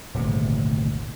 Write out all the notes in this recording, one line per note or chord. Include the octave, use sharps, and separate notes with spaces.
D#1 G#1 D2 C3